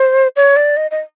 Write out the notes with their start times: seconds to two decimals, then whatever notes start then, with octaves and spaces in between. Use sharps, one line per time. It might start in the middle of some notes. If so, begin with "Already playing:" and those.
Already playing: C5
0.36 C#5
0.56 D5
0.77 D#5
0.91 D#5